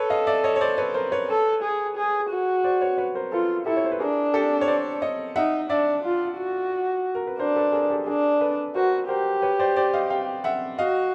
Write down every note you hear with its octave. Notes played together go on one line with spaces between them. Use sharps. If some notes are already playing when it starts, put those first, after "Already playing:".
Already playing: A4 B4 C#5
D#5 F5
D5 E5
C#5 D#5
C#5
C5 D5
B4 C#5
A#4 C5
B4 C#5
A4
G#4
G#4
F#4
C5 D5
B4 C#5
B4 C#5
A#4 C5
F4 A4 B4
E4 G4 A4
C#5
C5
B4
D4 G#4 A#4
G4 A4
C#5
C5 D5
C#5 D#5
D#4 E5 F#5
D4 D5 E5
F4
F#4
A#4
B4
D4 A#4 C5
A4 B4
G#4 A#4
G4 A4
D4 G#4 A#4
A4 B4
F#4 A#4 C5
G4 A#4 C5
B4 C#5
C5 D5
C5 D5
D#5 F5
F5 G5
E5 F#5
F#4 D#5 F5